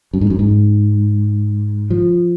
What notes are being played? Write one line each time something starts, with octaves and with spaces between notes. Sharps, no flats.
F#2
G#2
F#2
G#2
F3